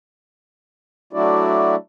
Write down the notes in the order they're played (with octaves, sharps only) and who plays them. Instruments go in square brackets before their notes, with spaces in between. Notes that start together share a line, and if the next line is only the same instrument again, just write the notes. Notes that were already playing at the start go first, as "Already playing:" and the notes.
[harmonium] F#3 A3 D4 E4 F#4 D5